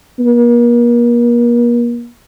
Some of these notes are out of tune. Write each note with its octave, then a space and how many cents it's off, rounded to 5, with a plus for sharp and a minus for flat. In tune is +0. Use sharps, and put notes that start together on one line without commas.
A#3 +40